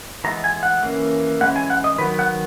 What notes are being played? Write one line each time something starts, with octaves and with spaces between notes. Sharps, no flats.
E3 G#3 B3 A#5
G#5
F#5
E3 A#3 C#4
E3 G#3 C#4 F#5
G#5
F#5
D#5
D#3 F#3 B3 B4
F#5